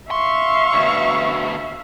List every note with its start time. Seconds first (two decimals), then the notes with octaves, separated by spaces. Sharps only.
0.11 E5 F5 C6 C#6
0.73 D2 B2